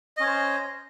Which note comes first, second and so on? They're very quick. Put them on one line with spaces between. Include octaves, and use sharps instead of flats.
D#5 C#4 C#5 C5